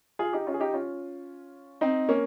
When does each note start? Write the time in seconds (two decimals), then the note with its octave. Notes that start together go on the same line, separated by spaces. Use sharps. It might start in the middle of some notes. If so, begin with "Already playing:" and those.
0.19 F4 G#4
0.33 D#4 G4
0.47 C#4 F4
0.54 G#4
0.60 D#4 G4
0.73 C#4 F4
1.81 C4 D#4
2.09 A#3 C#4